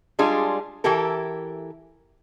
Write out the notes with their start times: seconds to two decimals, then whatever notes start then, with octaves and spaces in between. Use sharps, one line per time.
0.19 G3 G#3 D4 F4 G#4
0.84 E3 E4 G4 A4 A#4